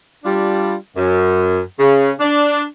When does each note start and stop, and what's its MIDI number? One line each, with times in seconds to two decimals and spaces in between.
0.25 0.75 55
0.25 0.75 62
0.25 0.75 65
0.97 1.60 42
1.80 2.11 49
2.20 2.63 62
2.20 2.63 74